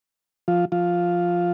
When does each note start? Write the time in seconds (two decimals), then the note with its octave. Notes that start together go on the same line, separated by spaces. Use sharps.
0.48 F3 F4
0.72 F3 F4